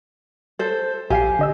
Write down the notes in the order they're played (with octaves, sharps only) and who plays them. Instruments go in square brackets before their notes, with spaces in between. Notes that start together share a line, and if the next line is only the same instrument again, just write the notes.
[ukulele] A4 C5
[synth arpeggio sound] A#1 F5 C7 [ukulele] G4 G#5
[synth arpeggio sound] D3 D#5 E6